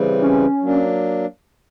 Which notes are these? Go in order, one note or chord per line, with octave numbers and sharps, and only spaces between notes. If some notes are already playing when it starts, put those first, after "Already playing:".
Already playing: C#3 E3 G3 C4
C#4
F#3 A#3 D4